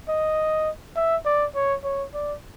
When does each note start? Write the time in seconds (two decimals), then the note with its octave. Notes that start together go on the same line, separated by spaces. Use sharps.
0.09 D#5
0.96 E5
1.26 D5
1.55 C#5
1.84 C#5
2.14 D5